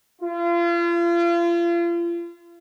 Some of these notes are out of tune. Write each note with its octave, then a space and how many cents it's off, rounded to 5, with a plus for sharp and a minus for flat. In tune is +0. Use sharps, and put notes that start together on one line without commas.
F4 -35